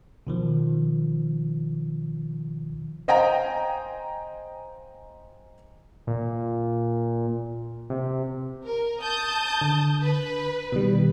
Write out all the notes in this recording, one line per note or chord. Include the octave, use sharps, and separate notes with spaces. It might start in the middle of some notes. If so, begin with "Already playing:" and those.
B2 D#3 F3
C5 D#5 F5 G5 G#5 A#5
A#2
C3
A#4
A5 D#6 G6
D3
B4
B2 D#3 G3